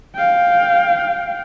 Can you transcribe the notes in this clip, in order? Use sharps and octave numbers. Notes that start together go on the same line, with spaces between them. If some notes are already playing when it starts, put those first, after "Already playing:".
F5 G5